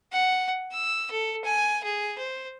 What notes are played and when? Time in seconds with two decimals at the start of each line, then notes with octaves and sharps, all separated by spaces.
0.12 F#5
0.72 E6
1.11 A4
1.45 G#5
1.84 G#4
2.18 C5